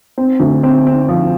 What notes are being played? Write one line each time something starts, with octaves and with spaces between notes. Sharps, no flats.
C4
D2
C4
C4
F3